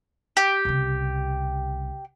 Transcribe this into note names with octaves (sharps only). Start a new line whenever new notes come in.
G4
C2 C#3